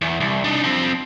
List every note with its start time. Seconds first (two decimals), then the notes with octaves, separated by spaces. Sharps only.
0.01 E2
0.20 C2
0.44 D4 D#4
0.64 F3 C4